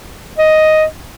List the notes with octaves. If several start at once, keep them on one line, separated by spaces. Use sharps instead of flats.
D#5